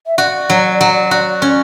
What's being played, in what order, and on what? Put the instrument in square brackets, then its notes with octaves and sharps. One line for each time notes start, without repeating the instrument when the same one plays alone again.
[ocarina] E5
[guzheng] F#4 [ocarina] D5
[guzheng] F#3
F#3
F#4
C#4